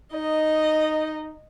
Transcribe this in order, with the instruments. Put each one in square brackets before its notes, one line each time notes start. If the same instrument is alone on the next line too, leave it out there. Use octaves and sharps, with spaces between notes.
[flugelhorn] D#4 [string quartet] D#5